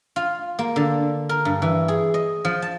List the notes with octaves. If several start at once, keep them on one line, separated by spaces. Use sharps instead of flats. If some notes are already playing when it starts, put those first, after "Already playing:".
F4
A#3
D3
A#4
G2
E3
G#4
D#5
F3
A5